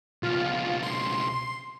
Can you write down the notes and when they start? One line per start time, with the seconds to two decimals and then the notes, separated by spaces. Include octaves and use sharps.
0.23 C#2 B2 F4
0.83 C6